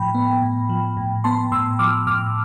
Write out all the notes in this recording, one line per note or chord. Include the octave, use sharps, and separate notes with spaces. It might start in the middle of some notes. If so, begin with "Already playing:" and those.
Already playing: A2 F3 G5 B5
B3
A2
F3
A2
B3 A5 C6
A2 C6 E6
F3 D6 F6
A2 D6 F6